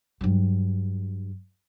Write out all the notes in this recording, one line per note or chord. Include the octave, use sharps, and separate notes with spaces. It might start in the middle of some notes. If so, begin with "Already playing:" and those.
G2 F#3